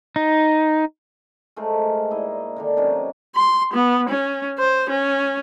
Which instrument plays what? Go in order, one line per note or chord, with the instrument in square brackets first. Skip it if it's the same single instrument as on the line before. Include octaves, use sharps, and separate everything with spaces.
[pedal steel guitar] D#4
[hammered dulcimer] G#3 A3 A#4 C5
A#2 D#4 E4 D#5
D3 D#3 D4
C3 F#3 C#4 D#4
[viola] C6
B3
C#4
C5
C#4